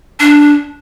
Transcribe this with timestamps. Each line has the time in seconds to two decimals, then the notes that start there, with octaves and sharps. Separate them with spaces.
0.20 D4